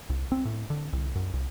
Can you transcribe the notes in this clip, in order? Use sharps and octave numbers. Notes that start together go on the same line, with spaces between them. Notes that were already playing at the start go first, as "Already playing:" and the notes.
C2
C4
A2
D3
C2
F#2
C2